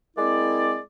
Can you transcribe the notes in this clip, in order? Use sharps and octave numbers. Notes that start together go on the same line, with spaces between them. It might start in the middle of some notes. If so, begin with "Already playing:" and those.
G#3 A#3 C4 E4 D5